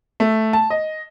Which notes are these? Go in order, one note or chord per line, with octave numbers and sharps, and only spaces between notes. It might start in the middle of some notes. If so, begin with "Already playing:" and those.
A3
A5
D#5